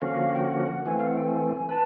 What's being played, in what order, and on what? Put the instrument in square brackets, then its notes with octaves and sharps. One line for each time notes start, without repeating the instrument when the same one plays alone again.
[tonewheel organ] D3 F3 A#3 C#4 F#4 [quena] F5
[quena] G5
F#5
[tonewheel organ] E3 A3 C4 [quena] G#5
[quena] F5
F#5
G5
G#5
[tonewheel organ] B4 [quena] A5